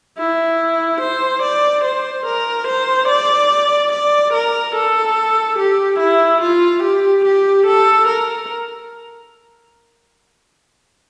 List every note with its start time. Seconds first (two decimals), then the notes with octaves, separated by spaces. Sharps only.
0.18 E4
1.01 C5
1.42 D5
1.84 C5
2.26 A#4
2.68 C5
3.08 D5
3.92 D5
4.33 A#4
4.75 A4
5.58 G4
5.99 E4
6.42 F4
6.83 G4
7.25 G4
7.66 A4
8.08 A#4